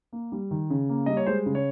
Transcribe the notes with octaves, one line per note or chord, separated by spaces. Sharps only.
A#3
G3
D#3
C#3
A#3
G3 D#5
C#5
G#3 C5
C#3
C#5